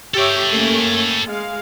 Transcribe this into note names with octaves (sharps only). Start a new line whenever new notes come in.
G4 A4 C#5 E5 G5
A3 A#3 C#4
G#3 F5